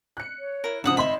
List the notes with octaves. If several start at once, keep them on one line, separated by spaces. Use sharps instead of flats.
F#6 C#7
C#5
E4 A#4
G#1 C#3 F3 D4 E5 F#5 D#6
G#1 D#5 E5 B5 C6